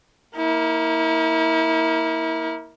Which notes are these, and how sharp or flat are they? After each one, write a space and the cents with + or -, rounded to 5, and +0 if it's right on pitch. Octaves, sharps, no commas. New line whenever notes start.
A#3 +0 E4 -30